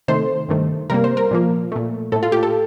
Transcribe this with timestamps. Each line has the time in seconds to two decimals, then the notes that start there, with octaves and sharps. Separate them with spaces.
0.08 C3 D#3 A3 C5
0.49 G2 D#3 A3
0.90 C3 G3 A#3 A#4
1.04 C5
1.17 A#4
1.31 A#2 F3 A#3
1.72 A#2 A3
2.12 A2 A3 A4
2.23 F4
2.32 G4
2.43 A4